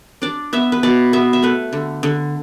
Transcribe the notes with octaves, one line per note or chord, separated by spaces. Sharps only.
D4 D5
B3 E5
B4
B2 D5
B3 E5
E5
A3 B4
D3
D3